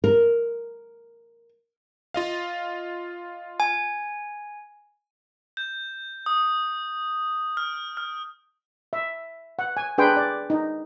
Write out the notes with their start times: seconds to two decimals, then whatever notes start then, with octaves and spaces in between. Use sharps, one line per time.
0.04 A#4
2.14 F4 D#5 F5
3.60 G#5
5.57 G6
6.26 D#6
7.57 F6
7.97 F6
8.93 E5
9.59 F#5
9.77 G#5
9.98 D4 G#4 B4 G5 G#5 C6
10.17 D5
10.50 D#4